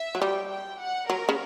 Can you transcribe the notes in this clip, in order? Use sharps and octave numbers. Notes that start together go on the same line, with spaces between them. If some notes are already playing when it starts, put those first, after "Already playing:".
Already playing: E5
F#3
G3 G5
G5
F#5
F#3 A#4
C#3